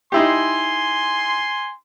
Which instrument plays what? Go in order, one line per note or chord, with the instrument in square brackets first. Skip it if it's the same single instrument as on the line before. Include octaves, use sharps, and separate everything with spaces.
[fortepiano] D#4 E4 G4 [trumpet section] G#5 C6